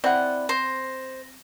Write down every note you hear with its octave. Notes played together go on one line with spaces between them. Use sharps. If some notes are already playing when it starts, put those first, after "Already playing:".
C4 E4 D5 F#5
C5 A#6